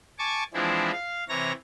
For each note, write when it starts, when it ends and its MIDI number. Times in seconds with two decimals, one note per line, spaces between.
0.19 0.43 80
0.19 0.43 81
0.19 0.43 85
0.19 0.43 86
0.54 0.91 52
0.54 0.91 53
0.54 0.91 56
0.54 0.91 60
0.54 0.91 62
0.54 0.91 64
0.93 1.24 77
1.29 1.52 48
1.29 1.52 52
1.29 1.52 73
1.29 1.52 82
1.29 1.52 94